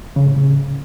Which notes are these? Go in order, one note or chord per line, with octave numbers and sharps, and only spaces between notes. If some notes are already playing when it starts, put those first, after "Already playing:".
C#3
A2
C#3